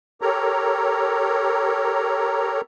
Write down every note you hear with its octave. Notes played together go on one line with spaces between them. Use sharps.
G4 A4 A#4 C#5 A#5